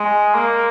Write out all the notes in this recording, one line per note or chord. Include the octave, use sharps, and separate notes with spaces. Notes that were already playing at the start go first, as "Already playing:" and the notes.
Already playing: G#3
A#3